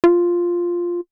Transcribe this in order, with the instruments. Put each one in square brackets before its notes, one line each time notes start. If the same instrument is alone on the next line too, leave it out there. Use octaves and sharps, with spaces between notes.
[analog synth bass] F4